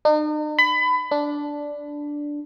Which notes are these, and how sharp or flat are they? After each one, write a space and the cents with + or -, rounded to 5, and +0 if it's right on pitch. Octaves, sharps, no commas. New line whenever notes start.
D#4 -45
B5 +25
D4 -5